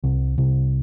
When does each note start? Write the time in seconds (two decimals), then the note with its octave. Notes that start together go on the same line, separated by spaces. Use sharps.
0.04 C2
0.38 C2